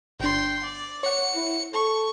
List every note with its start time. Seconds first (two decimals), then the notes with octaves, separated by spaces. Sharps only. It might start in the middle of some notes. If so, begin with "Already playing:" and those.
0.20 G1 D4 G5 C6
0.64 D5
1.03 C#5 F#5 C#7
1.34 E4
1.73 A4 C#6